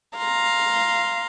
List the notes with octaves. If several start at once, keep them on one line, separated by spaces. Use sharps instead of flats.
F5 A#5 C6